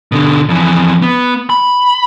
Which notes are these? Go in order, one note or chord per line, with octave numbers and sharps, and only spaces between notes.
B2 D3
F2 E3
B3
B5